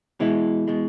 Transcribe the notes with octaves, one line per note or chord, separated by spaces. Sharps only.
B2 E3 G#3 E4
B2 G#3